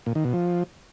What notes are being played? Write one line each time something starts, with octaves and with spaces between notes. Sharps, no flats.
A#2
D#3
B2
F3